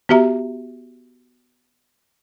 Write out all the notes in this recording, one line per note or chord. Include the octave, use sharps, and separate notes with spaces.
B3 F#4 G4 E5 A#5